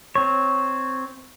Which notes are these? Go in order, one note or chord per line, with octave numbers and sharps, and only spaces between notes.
C4 C#5